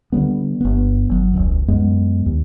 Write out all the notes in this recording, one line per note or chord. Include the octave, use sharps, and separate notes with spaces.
D3 E3 G3 B3
G1 B3
G1 F#3
E1 C#2
F#2 G#3 B3
D#2